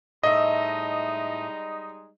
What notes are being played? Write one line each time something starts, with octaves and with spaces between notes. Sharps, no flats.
A2 G3 G#3 D#4 D#5 E5